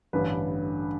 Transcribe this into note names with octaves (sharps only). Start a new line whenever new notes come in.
A1 G2 D3 B4